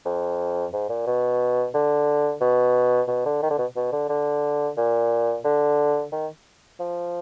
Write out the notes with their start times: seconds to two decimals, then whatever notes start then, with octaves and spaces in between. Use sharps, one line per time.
0.05 F2
0.73 G#2
0.89 A#2
1.07 B2
1.74 D3
2.41 B2
3.08 B2
3.25 D3
3.42 D#3
3.50 D3
3.58 B2
3.76 B2
3.92 D3
4.09 D3
4.77 A#2
5.44 D3
6.12 D#3
6.80 F3